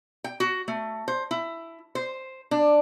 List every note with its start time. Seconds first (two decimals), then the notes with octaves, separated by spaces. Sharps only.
0.24 G5
0.40 F#4
0.68 A3
1.08 C5
1.31 E4
1.95 C5
2.51 D4